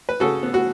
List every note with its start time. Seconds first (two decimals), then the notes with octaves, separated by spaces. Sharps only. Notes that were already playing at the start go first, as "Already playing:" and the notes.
0.09 B4
0.20 C#3 F#4 A4
0.43 B3
0.54 F#4